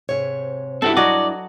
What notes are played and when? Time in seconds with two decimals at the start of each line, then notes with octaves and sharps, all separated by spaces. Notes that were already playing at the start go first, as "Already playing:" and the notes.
0.09 G#2 C3 C#5
0.82 G2 C4 E4 F#4 G4 A4
0.97 F#3 F#4 D5 D#5